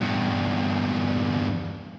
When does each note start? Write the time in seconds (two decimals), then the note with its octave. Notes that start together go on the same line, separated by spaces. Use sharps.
0.01 E2 G2